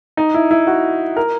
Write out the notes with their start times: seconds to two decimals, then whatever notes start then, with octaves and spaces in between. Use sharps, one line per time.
0.17 D#4
0.34 E4
0.51 E4
0.67 F#4
1.16 A#4